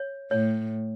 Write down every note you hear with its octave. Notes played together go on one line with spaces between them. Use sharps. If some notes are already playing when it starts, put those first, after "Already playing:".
Already playing: C#5
A2 C#5